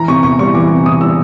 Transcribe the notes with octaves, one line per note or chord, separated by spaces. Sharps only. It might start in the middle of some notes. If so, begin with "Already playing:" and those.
Already playing: E3 A#5
C3 C#6
E2 C#6
G3 C#6
E3 D6
C3
E2 D#6
G3 E6